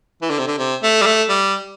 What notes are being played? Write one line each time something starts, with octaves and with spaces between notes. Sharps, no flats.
E3
D3
C3
D3
C3
A3
G3
A3
G3